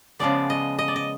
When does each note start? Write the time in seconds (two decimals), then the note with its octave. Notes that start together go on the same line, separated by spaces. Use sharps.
0.19 C#3 F3 G#3 B3 D5
0.50 D#5
0.79 D#5
0.88 D5
0.96 D#5